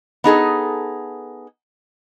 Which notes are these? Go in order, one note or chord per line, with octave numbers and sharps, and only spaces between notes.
B3 D#4 G#4 A4